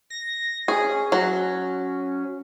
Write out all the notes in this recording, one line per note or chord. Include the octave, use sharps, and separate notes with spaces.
A#6
C#4 G#4
F#3